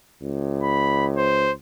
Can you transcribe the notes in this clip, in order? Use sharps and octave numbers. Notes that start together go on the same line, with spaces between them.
C#2
B5
C5